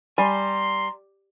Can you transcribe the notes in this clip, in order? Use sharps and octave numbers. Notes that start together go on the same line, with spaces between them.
G3 G#5 A#5 C6